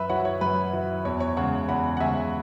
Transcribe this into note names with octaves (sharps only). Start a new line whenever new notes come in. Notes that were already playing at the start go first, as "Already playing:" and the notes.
Already playing: F#2 B4 E5
F#3 E4 C#5 F#5
C#5
F#2 B4
F#3 E4
E2 C#5
C#5
C#3 G#3 C#5 F#5
E2 F#5 B5
F#5
C#3 G#3 E5 G#5